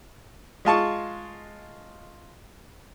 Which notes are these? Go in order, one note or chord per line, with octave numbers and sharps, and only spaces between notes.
G#3 F4 A5 C#6